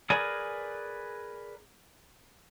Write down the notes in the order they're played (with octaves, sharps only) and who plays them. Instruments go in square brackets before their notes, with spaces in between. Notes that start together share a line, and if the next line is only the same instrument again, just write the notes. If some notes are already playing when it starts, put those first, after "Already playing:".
[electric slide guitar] G#4 A#4 B4 D5 G#5